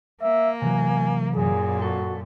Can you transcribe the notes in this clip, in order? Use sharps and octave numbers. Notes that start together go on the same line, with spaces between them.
A#3 E5
C3 E3 F#3 G#5
F#2 A#2 G#4
F#4 A4